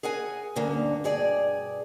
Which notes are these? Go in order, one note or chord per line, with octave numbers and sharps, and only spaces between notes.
G#4 A#4 F#5 G#5
D2 G2 D3 A#3 C#4
G2 B2 G#4 D5